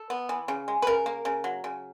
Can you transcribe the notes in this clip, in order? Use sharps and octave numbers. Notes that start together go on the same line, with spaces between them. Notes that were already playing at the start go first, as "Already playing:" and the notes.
Already playing: A4
B3
E3
C#3
G#3
B4
C#3 A#4
A#3
C#3
F#3
C#3